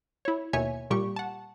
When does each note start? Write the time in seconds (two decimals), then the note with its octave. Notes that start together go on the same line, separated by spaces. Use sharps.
0.25 E4 C#5
0.53 D#2 B2 C#5 E5 G#5
0.91 A#2 G3 G4 C#6
1.16 F#5 A5